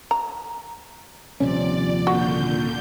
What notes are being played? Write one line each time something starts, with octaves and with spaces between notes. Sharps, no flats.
A#5
D#1 C3 F3 C#4 D5
A#2 D3 F#4 G6